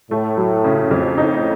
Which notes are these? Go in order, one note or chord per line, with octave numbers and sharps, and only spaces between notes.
A2 A3
F#3
C#3
F2
A2 D#4